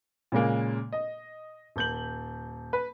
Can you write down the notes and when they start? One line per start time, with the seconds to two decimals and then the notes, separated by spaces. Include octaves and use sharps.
0.32 A#2 C#3 G#3 A#3
0.93 D#5
1.76 D#1 G6 F#7
2.73 B4